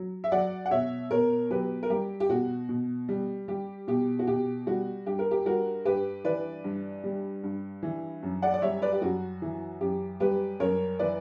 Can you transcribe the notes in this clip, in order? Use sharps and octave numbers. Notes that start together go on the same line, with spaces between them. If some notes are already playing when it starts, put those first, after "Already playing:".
Already playing: F#3
E5
F#3 D5 F#5
F#5
B2 C#5 E5
B2 A#4 C#5
F#3 G4 B4
A#4
G3 G4
G4
B2 F#4
B2
G3
G3 G4
B2 G4
F#4
B2 G4
G3 F#4
G2 G4
A#4
G4
G3 F#4 A#4
G2 G4 B4
E3 B4 D5
G2
G3
G2
E3
F#2
D5 F#5
D5
G3 C#5 E5
B4 D5
G4
F#2 F#4
E3
F#2 G4
G3 G4 B4
F#2 A#4 C#5
E3 B4 D5